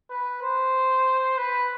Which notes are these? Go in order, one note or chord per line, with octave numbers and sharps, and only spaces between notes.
B4
C5
B4